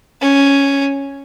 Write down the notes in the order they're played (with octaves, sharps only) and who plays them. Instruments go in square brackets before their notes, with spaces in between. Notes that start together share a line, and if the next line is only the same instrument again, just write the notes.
[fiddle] C#4